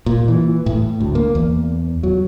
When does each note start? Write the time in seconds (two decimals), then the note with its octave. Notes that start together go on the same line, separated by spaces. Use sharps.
0.06 A#2
0.28 E3
0.66 A2
1.00 D2
1.15 A#3
1.35 E2
2.03 F#3